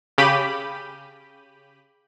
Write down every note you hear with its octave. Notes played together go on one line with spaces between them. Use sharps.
C#3 G4 B5 D#7